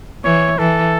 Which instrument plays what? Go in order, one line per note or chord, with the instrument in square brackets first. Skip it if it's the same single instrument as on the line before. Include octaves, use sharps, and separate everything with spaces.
[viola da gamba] E3 [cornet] C#5
[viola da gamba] E3 [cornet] A4